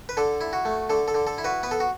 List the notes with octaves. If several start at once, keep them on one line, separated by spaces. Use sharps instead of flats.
B4
D3 A4
E4
F#4
A3
D3 A4
A4
D3
A4
E4
F#4 B4
B3 B4
A4
F#4